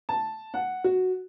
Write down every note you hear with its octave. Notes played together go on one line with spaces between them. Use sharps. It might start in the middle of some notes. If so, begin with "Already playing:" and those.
A5
F#5
F#4